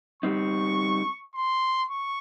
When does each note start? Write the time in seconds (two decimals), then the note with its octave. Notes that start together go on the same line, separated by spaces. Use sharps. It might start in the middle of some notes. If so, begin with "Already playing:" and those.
0.23 G3 C4 D#4 C#6
1.35 C6
1.90 C#6